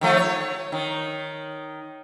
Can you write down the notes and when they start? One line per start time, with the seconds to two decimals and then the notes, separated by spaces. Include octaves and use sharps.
0.01 D#3 F3 A3
0.17 C#5
0.72 D#3